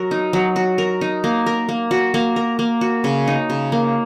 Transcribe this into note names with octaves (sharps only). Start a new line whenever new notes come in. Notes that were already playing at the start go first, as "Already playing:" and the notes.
Already playing: F#3 F#4 A#4
D#4
F#3
F#4
A#4
D#4
A#3
A#4
A#3
F#4
A#3
A#4
A#3
F#4
C#3
D#4
C#3
A#3